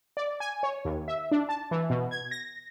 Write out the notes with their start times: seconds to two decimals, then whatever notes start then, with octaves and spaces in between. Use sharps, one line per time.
0.17 D5
0.40 G#5
0.63 C#5
0.85 D#2
1.08 E5
1.31 D4
1.49 A5
1.71 E3
1.90 B2
2.11 G#6
2.31 A#6